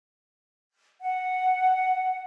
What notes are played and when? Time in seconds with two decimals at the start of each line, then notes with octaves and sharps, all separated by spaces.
1.01 F#5